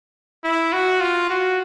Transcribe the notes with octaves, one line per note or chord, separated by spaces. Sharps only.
E4
F#4
F4
F#4